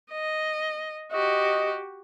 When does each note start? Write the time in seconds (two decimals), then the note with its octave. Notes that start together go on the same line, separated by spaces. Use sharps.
0.11 D#5
1.12 F#4 G4 D#5